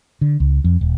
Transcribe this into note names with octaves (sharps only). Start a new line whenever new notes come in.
D3
C#2
F2
D#1